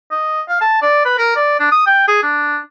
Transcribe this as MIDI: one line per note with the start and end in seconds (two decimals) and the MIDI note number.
0.11 0.41 75
0.49 0.59 77
0.61 0.80 81
0.82 1.04 74
1.05 1.18 71
1.18 1.32 70
1.36 1.59 74
1.59 1.69 62
1.72 1.86 87
1.86 2.05 79
2.07 2.19 68
2.23 2.59 62